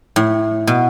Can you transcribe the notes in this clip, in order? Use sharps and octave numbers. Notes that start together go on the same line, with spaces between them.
A2
B2